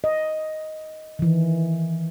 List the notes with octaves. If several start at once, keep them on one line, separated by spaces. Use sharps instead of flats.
D#5
D#3 E3